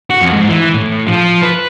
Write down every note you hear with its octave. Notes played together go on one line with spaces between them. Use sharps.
F#4
F2
G#2
E3
A2
F3
B4